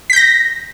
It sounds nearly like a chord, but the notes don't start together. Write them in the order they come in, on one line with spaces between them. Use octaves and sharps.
B6 G6 A#6